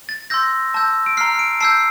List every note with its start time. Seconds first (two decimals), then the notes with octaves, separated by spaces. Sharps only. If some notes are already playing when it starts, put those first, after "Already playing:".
0.09 A6
0.30 C6 E6 G6 A#6
0.74 A5 E6 G6
1.06 D7
1.17 A#5 F6 C7
1.39 D7
1.61 A5 E6 G6 C7